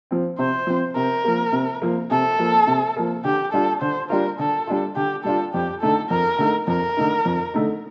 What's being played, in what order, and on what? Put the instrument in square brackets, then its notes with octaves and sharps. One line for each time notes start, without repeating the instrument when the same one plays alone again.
[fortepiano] F3 C4
[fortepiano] C3 [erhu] C5
[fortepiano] F3 C4
[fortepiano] C3 [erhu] A#4
[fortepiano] F3 A#3
C3
F3 A#3
[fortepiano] C3 [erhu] A4
[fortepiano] F3 A#3
C3
F3 A#3
[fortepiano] D3 [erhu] G4
[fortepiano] G3 D4 F4 [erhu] A4
[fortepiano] D3 [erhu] C5
[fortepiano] G3 D4 F4 [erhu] A#4
[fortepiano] D3 [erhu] A4
[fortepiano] G3 D4 F4
[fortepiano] D3 [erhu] G4
[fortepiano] G3 D4 F4 [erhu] A4
[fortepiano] F2 [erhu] G4
[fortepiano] D3 A3 D#4 [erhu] A4
[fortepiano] F2 [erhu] A#4
[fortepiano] D3 A3 D#4
[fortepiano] F2 [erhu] A#4
[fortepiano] D3 A3 D#4
F2
D3 A3 D#4